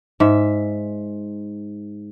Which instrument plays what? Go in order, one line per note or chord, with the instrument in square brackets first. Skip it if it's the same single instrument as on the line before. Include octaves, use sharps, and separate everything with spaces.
[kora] G#2 E5